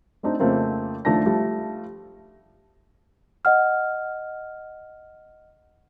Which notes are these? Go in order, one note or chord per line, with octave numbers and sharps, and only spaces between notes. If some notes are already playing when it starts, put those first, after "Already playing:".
A3 C4 D4 D#4
F2 C#3 A3 A#3 C4
D#2 F3 A3 D4 A5 A#6
F3 G3 A3
D#5 F#5 F6